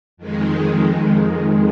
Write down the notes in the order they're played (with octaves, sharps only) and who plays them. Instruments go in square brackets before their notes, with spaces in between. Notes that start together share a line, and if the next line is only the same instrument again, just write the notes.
[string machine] F2 D#3 G#3